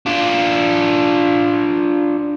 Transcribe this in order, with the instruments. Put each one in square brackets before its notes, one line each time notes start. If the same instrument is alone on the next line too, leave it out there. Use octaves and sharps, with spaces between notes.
[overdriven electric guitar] D4 F4